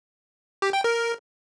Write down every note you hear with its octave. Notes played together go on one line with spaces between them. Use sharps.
G4
G5
A#4